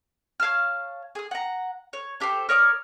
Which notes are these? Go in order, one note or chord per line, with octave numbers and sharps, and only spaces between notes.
C#5 F5 A5 F6
G#4 D#6
F#5 A#5
C#5
D4 G4 A4 C5
A#4 C#5 D5 D#6